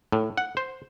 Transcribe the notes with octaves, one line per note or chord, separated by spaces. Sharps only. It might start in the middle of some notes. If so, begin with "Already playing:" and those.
A2
F#5
C5